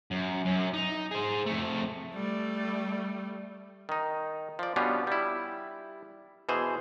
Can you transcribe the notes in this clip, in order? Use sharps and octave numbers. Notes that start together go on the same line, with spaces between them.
F#2
F#2 C#4
D#4
G#4 C5
F2 A3
G3 A3
D#3 D#4
F3 D5
B2 G3 B3 C#4 D4 F4
G3 E4
B2 E3 G#4 C5